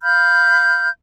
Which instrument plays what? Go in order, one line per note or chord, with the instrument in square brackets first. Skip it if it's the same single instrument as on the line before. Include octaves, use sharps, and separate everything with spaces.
[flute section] F5 B5 F6 G6